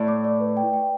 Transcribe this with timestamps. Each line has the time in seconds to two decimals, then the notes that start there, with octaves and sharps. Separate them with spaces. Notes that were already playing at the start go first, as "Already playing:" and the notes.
Already playing: A2 D5
0.08 D6
0.24 D5
0.41 B4
0.57 G5
0.73 G5